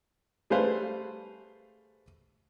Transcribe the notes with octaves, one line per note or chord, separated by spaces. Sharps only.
G3 A3 G#4 B4 C5 F5